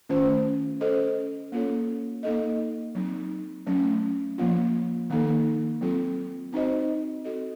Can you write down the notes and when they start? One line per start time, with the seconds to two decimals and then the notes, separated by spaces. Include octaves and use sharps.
0.09 D#3 A3 C#4 F4 C5
0.80 C#4 A4 C5 D#5
1.52 A#3 C#4 F4 A4 C#5
2.23 A#3 D#4 A4 D#5
2.95 F#3 C4 D#4
3.67 F#3 A3 C#4
4.38 F3 A#3 F4
5.10 D#3 A#3 D#4 A4
5.81 F#3 C4 F4 A4
6.52 C4 D#4 F#4 C5 D#5
7.24 C4 F#4 A4 D#5